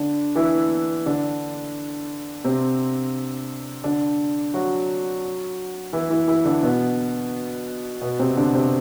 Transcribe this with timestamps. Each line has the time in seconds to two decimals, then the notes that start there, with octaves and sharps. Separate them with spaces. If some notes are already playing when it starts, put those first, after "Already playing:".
Already playing: D3 D4
0.36 E3 E4
1.06 D3 D4
2.44 C3 C4
3.84 D3 D4
4.54 F#3 F#4
5.93 E3 E4
6.10 E3 E4
6.28 E3 E4
6.45 D3 D4
6.63 B2 B3
8.01 B2 B3
8.19 C3 C4
8.37 D3 D4
8.54 C3 C4